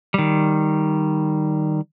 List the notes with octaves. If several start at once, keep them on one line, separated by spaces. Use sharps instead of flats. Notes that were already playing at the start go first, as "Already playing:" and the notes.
D#3 G3